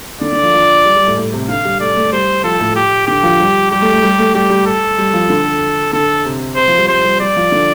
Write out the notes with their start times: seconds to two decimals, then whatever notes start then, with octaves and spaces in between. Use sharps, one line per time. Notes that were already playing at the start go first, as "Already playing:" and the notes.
0.21 D3 D5
0.32 D3
0.43 F3
0.54 F3
0.85 G3
0.96 G3
1.06 A2
1.17 A2
1.33 C3
1.48 D3 F5
1.65 G3
1.81 A3 D5
1.97 A3
2.12 G3 C5
2.44 F3 A4
2.60 A2
2.76 G4
3.07 D3 G4
3.23 F3
3.39 G3
3.71 G3 G4
3.82 A3
3.92 A3
4.03 G3
4.19 A3
4.35 G3 G4
4.50 G3
4.66 A4
4.98 G3
5.14 F3
5.30 D3
5.93 D3 A4
6.25 C3
6.56 C3 C5
6.68 F3
6.78 G3
6.88 G3 C5
7.04 G3
7.20 G3 D5
7.36 F3
7.52 D3